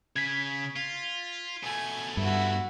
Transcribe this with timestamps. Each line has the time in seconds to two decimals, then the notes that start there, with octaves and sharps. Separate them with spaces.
0.16 C#3 G#6 B6
0.76 F4
1.63 B2 A3 G#5
2.17 G2 E4 F#4